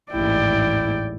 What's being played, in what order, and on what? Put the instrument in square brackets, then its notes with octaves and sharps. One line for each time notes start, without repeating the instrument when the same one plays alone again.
[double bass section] A1 D#2 G#2 [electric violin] E4 [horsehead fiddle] D5 G5